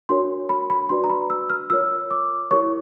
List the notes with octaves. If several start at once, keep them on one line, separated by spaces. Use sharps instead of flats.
D4 F#4 A#4 C#5 C6
B5
B5
D4 F#4 B4 D5 C6
A#5
B5
E6
F6
F4 A#4 C#5 E6
D6
E4 G4 A#4 C#5 C#6